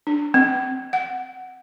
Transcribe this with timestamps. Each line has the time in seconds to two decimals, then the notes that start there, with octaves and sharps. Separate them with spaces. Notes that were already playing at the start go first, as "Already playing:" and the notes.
0.07 D4
0.34 C4
0.93 F#5